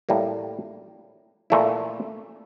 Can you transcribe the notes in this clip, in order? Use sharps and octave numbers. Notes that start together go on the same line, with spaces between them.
A2 G3 A#3
A#2 A3 E4